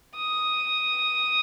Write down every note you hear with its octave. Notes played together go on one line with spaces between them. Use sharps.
D#6